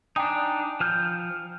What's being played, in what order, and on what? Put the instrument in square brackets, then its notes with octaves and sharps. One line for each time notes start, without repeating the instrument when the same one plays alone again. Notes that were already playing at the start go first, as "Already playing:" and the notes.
[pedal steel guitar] D4 D#4 [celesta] G5 G#5 D#6
[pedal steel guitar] F3 F6 G6